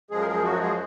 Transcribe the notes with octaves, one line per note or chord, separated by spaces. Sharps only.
F#2 F3 G#3 G#4
A#4
G#3 G#4
F#3 F#4
G#3 G#4